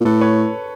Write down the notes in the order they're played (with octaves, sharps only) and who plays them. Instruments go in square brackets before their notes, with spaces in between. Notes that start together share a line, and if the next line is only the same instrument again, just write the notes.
[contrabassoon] A#2
[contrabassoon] A2 [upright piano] A4 B4
[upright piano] B4 C#5